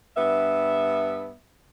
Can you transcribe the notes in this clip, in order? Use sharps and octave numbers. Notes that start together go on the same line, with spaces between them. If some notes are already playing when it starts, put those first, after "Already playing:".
G2 B3 E5